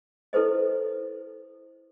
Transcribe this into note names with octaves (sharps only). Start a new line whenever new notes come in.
E4 A4 B4 C5 D#5